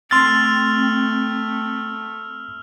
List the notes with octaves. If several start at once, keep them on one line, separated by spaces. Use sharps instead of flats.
A3 C4 C6 E6 F6 A6 F7